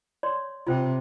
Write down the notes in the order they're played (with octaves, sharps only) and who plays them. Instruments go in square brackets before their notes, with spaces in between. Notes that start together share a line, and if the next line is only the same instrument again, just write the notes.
[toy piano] C#5 D5 C6
[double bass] C3 [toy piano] F4 C5 G5